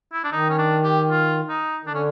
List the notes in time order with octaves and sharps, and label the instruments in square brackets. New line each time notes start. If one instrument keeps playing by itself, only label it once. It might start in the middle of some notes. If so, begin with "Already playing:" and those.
[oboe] E4
D4
[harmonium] D#3 [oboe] D#4
[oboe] C#4
D4
G4
F4
D#4
[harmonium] D#3
[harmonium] D3 [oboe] D4
[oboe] C#4